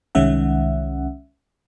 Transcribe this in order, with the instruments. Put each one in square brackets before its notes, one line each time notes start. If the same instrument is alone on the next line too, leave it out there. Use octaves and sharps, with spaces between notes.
[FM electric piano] C2 D#3 G#3 C#4 E5 F#5